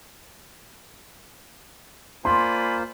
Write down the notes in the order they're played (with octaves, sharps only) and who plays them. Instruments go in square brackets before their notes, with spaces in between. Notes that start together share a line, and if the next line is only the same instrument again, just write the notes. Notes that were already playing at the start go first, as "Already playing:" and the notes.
[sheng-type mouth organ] A#3 F4 C5 [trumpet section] D5 G#5 B5 [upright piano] C6